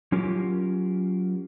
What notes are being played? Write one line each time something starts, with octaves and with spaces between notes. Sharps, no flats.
F#3 C#4 F4 G4 A#4